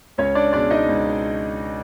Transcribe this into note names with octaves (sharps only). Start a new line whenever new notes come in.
C#2 C#4 C#5
D4 D5
B2 G#3 C#4 D4 D5
D#4 D#5
C#2